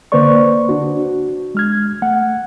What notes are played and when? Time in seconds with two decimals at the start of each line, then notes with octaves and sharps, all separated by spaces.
0.12 D3 A#3 B4 C5 D5 C#6
0.69 D4 F#4
1.55 G#3 F6 G#6
2.02 A3 F#5